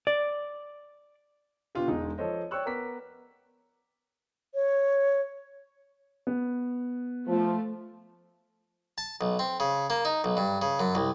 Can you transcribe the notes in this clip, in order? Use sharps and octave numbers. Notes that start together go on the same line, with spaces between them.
D5
B2 D4 F4 G4
E1 G#3 D#4
F3 A4 C5 C#5 D#5
C#5 D5 G5 C#6 E6 F#6
B3 A#4 A#5 D6 B6
C#5
B3
F3 A3
A5
B1
C4
C#3
A#3
D#4
B1
G2
C#3
F#2
C2